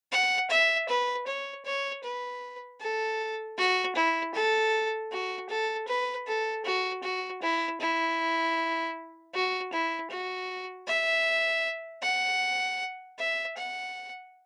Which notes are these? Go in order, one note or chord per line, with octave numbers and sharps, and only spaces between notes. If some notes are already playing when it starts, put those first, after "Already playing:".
F#5
E5
B4
C#5
C#5
B4
A4
F#4
E4
A4
F#4
A4
B4
A4
F#4
F#4
E4
E4
F#4
E4
F#4
E5
F#5
E5
F#5